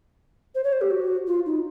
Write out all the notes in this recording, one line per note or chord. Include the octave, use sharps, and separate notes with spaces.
C5
C#5
C5
G4
F#4
F4
D#4